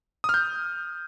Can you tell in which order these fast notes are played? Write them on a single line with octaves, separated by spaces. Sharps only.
D#6 F6 G6